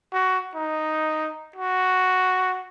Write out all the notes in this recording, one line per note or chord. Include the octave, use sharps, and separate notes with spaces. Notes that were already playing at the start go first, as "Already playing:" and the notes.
F#4
D#4
F#4